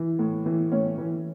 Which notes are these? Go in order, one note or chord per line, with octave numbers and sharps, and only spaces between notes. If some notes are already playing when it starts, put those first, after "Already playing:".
Already playing: E3
A2
E3
A2 C#4
E3